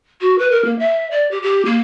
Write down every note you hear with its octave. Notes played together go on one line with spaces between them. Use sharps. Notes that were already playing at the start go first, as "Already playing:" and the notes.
F#4
B4
A#4
A#3
E5
D5
G4
G4
A#3